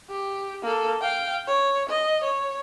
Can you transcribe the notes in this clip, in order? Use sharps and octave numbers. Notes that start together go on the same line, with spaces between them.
G4
A#3 A4
F5 G5
C#5
D#5
C#5